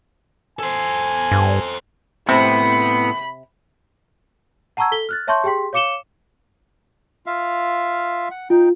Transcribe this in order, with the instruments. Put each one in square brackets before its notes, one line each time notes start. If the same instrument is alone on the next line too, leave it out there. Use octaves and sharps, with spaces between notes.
[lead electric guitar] A4 C5 [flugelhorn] G#5
[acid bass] G2
[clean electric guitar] A2 C4 [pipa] C3 [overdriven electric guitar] B3 [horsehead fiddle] B5
[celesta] F#5 A5 A#5 C#6 E6 G#6
A4 B6 G7
F6 F#6 A6
C#5 E5 A5 C6 C#6 G6
G4 G#4 G5 C6 B6
C#5 F5 D6 C#7 E7 G7
[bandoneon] F4 E5 F5
F#5
[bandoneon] D#4 G5 [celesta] F4